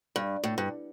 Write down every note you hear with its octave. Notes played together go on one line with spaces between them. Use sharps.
G2
A2
G2